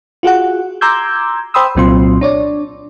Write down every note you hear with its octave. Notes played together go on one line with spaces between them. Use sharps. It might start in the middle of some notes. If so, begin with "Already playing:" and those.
F4 F#4 G#4 F#5
A#5 C6 D6 E6 G6 G#6
C5 G5 B5 C6 D#6 E6
C2 A#2 F#3 C4 F4 C6
D4 C#5 D5